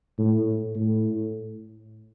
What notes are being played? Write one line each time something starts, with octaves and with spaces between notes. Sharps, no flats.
A2
A2